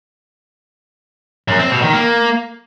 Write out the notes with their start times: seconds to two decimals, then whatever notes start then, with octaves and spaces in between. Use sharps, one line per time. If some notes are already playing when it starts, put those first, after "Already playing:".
1.48 F#2
1.59 C4
1.71 B2
1.82 D#3
1.93 A#3